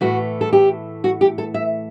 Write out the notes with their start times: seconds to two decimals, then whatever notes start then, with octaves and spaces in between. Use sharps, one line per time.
0.01 A2 E3 A3 F#4
0.41 A4
0.53 G4
1.04 F#4
1.21 G4
1.38 A4
1.54 E5